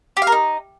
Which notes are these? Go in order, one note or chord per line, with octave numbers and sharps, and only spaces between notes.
G4
F5
A#4
D#4